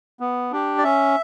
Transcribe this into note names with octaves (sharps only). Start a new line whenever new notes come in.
B3
D4 G4
D5
C#4 E5